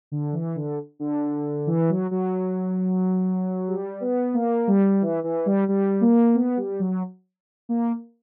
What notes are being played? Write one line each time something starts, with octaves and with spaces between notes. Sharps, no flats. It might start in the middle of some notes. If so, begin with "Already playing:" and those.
D3
E3
D3
D3
E3
F#3
F#3
G3
B3
A#3
G3
E3
E3
G3
G3
A#3
B3
G3
F#3
A#3